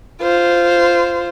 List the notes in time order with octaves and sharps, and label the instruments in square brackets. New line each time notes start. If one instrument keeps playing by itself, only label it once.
[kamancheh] F4 C5